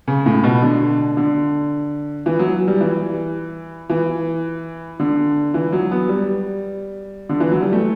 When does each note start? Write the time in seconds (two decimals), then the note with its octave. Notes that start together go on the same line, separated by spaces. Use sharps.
0.08 C#3
0.26 A2
0.43 B2
0.62 D3
1.17 D3
2.26 E3
2.39 F#3
2.68 G3
2.81 E3
3.90 E3
5.00 D3
5.54 E3
5.73 F#3
5.91 B3
6.09 G3
7.29 D3
7.40 E3
7.51 F#3
7.62 G3
7.73 A3